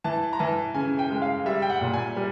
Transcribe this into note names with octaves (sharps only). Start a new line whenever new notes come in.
E3 A5
A#5
E3 A5
C#3 G#5
G5
G#3
F5
G3 E5
G5
F#5
A#2
G#5
G3